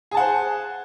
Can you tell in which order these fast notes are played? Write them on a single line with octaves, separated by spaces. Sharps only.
G#4 A5 F#5 C5